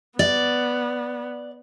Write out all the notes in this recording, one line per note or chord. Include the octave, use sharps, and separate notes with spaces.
B3 D5